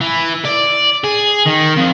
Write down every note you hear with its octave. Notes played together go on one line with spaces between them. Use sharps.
E3
D5
G#4
D#3
F2